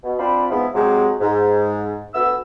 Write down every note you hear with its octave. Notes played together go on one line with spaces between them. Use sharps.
B2
C4 D4 F4 B5
G#2 F3 B3 E4
C3 F#3 G#3
G#2
D2 B3 E6